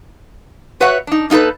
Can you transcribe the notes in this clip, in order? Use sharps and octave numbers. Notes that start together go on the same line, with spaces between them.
F#4 B4 C#5 E5 F#5
D4 D#4
A#3 D#4 F4 A4 B4